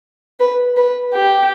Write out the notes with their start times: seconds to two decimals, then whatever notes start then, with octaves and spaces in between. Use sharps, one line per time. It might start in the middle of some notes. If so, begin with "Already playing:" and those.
0.40 B4
0.77 B4
1.14 G4